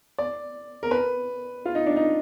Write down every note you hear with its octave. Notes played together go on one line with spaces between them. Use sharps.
D5
A#4
B4
F4
D#4
D4
D#4